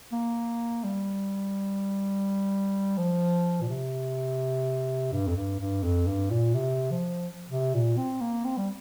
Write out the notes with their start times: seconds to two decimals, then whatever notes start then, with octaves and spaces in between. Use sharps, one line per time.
0.12 A#3
0.84 G3
2.98 F3
3.61 A#2
3.69 C3
5.12 G2
5.28 F2
5.37 G2
5.60 G2
5.83 F2
6.08 G2
6.31 A#2
6.54 C3
6.91 F3
7.50 C3
7.74 A#2
7.97 C4
8.21 A#3
8.45 C4
8.57 G3